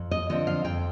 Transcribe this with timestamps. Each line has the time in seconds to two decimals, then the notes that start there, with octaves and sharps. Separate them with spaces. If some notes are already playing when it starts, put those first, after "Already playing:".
Already playing: F2
0.11 D#5
0.29 D3 F3 C4 D#5
0.47 F5
0.65 F2 G5